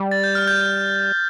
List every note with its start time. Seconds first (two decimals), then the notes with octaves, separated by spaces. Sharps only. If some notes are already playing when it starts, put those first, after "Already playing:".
Already playing: G3
0.11 A6
0.24 G6
0.35 F6
0.47 G6